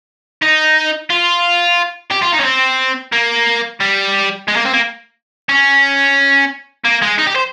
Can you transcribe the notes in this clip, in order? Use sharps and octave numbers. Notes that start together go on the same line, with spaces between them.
D#4
F4
G4
F4
D#4
C#4
C4
A#3
G3
G#3
A#3
C4
A#3
C#4
A#3
G#3
D#4
G4
C5